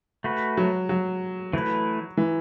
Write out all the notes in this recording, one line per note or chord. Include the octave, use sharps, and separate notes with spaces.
A3 F#4 B4
F#3
F#3
E3 A3 E4 B4
E3